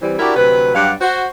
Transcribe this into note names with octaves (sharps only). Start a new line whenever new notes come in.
E3 G3 C4
D4 E4 F#4 G4 A#4 D5
D2 C3 F#3 B4
G2 F#3 D4 G4 F5 F#5
F#4 C5